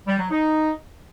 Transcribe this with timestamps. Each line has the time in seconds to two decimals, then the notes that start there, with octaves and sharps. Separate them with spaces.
0.07 G3
0.19 F#3
0.31 D#4